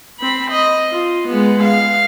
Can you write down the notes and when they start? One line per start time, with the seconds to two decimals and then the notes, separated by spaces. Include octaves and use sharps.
0.20 C4 B5
0.51 D#5
0.91 F4
1.28 G#3 B3
1.63 F5